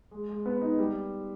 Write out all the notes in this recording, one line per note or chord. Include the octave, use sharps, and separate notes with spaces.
G#3
G#3
B3
D#4
G3